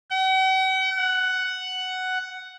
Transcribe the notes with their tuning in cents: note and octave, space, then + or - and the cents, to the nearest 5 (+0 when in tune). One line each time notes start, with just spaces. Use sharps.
F#5 +45
F#5 +5